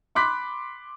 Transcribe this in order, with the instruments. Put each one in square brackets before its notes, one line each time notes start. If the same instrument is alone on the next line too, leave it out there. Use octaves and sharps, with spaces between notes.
[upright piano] B5 C6 D6 F#6 B6